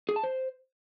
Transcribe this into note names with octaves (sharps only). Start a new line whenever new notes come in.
G#4
A5
C5